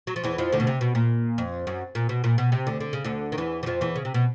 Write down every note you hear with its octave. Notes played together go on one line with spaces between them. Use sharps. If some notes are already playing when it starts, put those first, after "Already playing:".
F#3
F3
E2 E3
F2 F3
D2 D3
B2
C3
B2
A#2
F2
F#2
A#2
B2
A#2
B2
C3
D2 D3
D3
C#3
D2 D3
D#3
E2 E3
E3
F2 F3
E2 E3
C#3
C3
B2